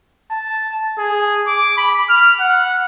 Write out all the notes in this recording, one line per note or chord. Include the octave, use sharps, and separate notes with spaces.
A5
G#4
D6
B5
F6
F#5